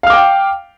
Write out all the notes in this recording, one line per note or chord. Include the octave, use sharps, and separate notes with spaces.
F5 G5 D6 F6